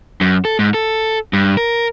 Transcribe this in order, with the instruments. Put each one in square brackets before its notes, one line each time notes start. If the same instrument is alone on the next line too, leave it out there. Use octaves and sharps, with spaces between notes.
[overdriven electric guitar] F#2
A4
G#2
A4
G2
A#4